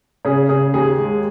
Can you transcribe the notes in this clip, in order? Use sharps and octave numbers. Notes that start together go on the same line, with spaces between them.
C#3 G#4
C#3 G#4
D#2 G#4
G#3